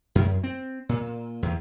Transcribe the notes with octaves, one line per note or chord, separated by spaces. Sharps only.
F#2
C4
A#2
E2